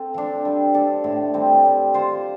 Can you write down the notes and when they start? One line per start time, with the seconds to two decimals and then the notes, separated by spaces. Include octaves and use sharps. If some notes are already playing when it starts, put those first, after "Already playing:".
Already playing: C4 A4
0.14 F3 D4
0.45 G3
0.74 D4 A4
1.04 A2
1.34 G3 C4
1.65 G3
1.94 F4 C5